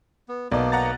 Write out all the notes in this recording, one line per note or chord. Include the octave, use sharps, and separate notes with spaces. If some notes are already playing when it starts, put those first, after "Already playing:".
B3
B1 A#3 B3 D#4 D5
F#5 A#5 A6